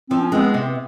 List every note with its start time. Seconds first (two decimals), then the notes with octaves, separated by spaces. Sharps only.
0.10 F3 C4
0.21 C#4
0.32 G#3 B3 C4
0.54 C3